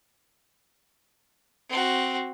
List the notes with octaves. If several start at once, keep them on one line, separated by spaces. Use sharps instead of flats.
C4 F#4